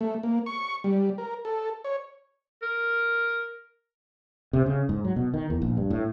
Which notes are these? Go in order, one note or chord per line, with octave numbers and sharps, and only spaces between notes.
A3
A#3
C#6
G3
A#4
A4
C#5
A#4
C3
C#3
G#2
F#3
B2
D#3
E2
A#1
G2
A2